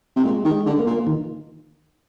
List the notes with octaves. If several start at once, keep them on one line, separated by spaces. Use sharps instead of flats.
C3
A#2 G#3
D#3
G#3
D3
A#3
A#2
D#3